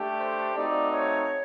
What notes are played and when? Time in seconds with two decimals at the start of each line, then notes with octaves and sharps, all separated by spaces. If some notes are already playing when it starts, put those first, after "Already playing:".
Already playing: A3 D4 G4
0.19 C5
0.55 A3 C4 D#4 F#4 D5
0.92 C#5